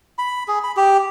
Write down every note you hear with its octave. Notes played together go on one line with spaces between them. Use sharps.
B5
G#4
B5
G4